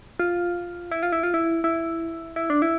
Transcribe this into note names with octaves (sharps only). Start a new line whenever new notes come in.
F4
E4
F4
E4
F4
E4
E4
E4
D4
E4